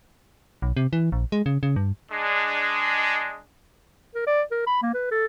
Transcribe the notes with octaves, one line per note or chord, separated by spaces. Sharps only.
B1
C3
E3
A#1
G#3
C#3
C#3
G2
G#3 D4
A#4
D5
A#4
B5
A#3
B4
A4